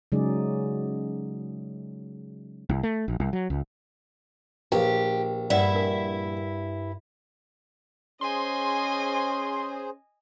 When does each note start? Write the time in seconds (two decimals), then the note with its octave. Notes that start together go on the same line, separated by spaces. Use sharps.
0.12 C#3 F#3 G#3 D#4 G#4 D5
2.69 C2
2.83 A3
3.08 A#1
3.20 C2
3.33 F#3
3.50 C#2
4.72 A#1 G4 B4 F5
5.50 G2 E4 D5 E5 F#5
5.74 D4 A#4
8.21 C#4 G#4 C5 D#5 G#5 C6